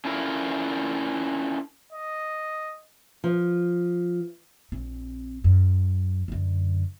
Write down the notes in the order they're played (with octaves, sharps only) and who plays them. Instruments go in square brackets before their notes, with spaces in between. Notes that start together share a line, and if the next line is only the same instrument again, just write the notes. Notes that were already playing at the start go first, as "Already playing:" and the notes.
[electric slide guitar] C#4 D4 E4 F4 A4 A#4
[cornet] D#5
[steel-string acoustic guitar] F3
[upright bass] A#1 C4
F#2
F#2 D3